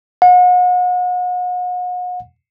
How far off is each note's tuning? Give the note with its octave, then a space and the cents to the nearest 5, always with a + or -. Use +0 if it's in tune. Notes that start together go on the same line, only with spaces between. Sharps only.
F#5 -40